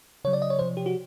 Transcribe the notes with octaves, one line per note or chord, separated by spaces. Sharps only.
C#3 F#3 C#5
D5
D#5
C#5
C3 F3 C5
G4
F#4